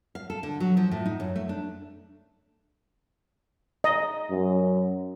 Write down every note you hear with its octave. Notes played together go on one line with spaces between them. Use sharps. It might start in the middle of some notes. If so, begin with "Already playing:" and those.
F5
A4
D3
F#3
F3
A2
D#4
F#2
A3
D4
D#5
F#2